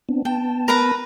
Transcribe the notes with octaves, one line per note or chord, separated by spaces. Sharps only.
B3 C4 D4
B3 G5 A5
A#4 B4 A#5